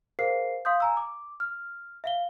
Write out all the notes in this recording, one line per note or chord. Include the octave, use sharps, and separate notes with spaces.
G#4 A#4 C5 F5 C7
F5 C6 D#6 G6
G#5 A#5 E6
D6
F6
E5 F5 G7